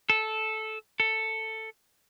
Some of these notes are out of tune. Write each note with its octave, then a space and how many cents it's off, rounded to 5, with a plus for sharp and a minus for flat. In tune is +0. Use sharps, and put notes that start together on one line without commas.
A4 -10
A4 +10